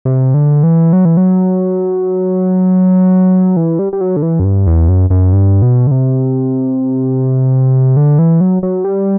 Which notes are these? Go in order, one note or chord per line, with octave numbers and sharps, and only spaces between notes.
C3
D3
E3
F#3
E3
F#3
E3
G3
G3
F#3
D3
E3
F#2
G2
E2
F#2
F#2
G2
B2
D3
C3
D3
E3
F#3
F#3
G3